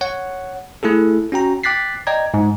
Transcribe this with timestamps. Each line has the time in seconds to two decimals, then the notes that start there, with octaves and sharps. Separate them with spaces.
0.01 C#5 F#5
0.83 A3 E4 G#4 A4
1.32 C#4 F#4 G5 A#5
1.63 G5 D6 F#6 A6 B6 C7
2.07 D5 D#5 G5 A#5 G#6
2.34 G#2